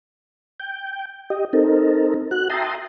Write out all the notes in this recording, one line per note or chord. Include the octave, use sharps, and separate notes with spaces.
G5
G4 D#5
C4 D#4 A4 A#4
F#4 F#6
E5 G5 A5 A#5 C6 D#6